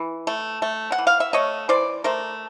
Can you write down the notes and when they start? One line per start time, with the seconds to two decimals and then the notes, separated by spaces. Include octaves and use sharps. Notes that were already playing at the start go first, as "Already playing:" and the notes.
Already playing: E3
0.27 A3
0.62 A3
0.92 F#5
0.98 E3
1.07 F5
1.20 E5
1.33 A3 C#5 D#5
1.69 E3 C5 D5
2.04 A3 A#4 C5